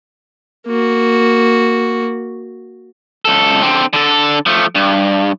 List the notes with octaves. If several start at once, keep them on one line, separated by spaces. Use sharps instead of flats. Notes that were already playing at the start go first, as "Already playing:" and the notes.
A#3 F#4
C#2 A4
D3 C4
D3 A4
F3 A3
G2